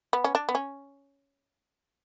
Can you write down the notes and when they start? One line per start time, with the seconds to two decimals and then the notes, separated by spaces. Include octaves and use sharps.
0.13 B3
0.24 C#4
0.35 D4
0.49 B3
0.55 C#4